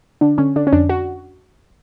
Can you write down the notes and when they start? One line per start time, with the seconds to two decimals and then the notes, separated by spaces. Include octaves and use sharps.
0.21 D3 D4
0.38 D3 C#4
0.56 D3 D4
0.67 C#4
0.73 F2 D4
0.89 F#4